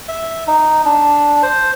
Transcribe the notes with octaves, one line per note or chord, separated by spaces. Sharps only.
E5
D#4
D4
C5